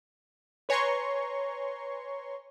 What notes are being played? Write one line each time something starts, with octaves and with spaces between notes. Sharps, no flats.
B4 C#5 G#5 A#5 C6 C#6